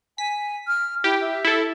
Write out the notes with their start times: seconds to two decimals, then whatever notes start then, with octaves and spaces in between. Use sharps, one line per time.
0.18 G#5 B6
0.67 F6
1.04 E4 G4
1.21 E5
1.45 E4 A4